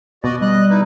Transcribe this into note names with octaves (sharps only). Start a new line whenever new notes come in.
B2 F#4 D5 D#5
G3 D#5 F#6
D#4 E4 B4